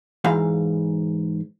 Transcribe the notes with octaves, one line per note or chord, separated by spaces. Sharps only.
G#2 E3 F5